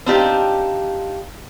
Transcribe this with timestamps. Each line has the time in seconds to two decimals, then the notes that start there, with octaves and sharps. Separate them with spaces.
0.06 C4 D4 D#4 F4 G4